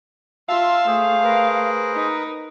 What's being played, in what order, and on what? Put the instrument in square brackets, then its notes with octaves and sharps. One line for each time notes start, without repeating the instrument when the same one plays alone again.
[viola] F4 C6 [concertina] E5 A5 F6 [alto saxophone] F5 [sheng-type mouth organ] E6
[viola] A3 [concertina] G#4 C5
[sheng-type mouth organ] A#4 B4
[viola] D#4